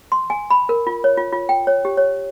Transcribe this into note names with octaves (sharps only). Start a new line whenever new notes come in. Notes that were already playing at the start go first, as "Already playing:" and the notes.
C6
G#5
B5
A#4
F4
C#5
F4
F4
G5
C#5
G4
C#5